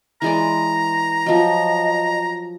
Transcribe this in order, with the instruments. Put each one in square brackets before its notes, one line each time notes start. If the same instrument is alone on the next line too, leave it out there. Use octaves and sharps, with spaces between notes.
[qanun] E3 G#3 D5 [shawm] A#5
[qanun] F3 F#3 [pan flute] D#5